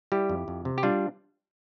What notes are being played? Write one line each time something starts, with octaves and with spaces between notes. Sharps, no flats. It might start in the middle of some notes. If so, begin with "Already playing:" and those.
G3 E4 G4
F2
F2
C3
G4
G3 D4 F4